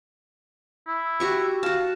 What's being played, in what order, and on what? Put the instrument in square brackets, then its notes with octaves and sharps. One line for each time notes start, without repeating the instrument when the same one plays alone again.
[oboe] E4
[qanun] F#4 G4 C#6
[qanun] F#4 A5 [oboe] F5